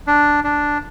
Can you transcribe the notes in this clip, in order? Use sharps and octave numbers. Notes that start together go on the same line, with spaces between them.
D4
D4